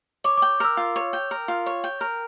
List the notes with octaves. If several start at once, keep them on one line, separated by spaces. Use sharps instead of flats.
C#5 D6
D6
G5
A#4 E6
F4
C#5
G5
A#4
F4
C#5
G5
A#4